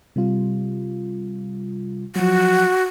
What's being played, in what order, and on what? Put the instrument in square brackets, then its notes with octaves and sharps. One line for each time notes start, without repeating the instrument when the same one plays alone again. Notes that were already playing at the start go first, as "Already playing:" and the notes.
[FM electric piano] C3 G3 F4
[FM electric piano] F3 F#3 [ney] F#4